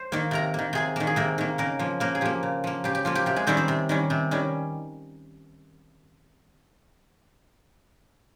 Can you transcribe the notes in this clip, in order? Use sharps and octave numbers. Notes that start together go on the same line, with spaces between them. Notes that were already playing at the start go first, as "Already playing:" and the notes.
Already playing: C5 C6
D#3 A#3
C3 A#4 A#5
D#3 A#3
C3 G#4 G#5
D#3 A#3
G#4
C3 A#3 A#4
D#3 A#3
C#3 A#3 A#4
F3 A#3
C#3 A#3 A#4
G#4
F3 A#3 G4
C#3
F3 A#3
C#3 G4
G4
F3 A#3 F4
G4
C3 G4
G#3 G#4
D#3 G3 C4 C#4 C5
C4 C5
C3
D#3 G3 C#4
C3
D#3 G3 C#4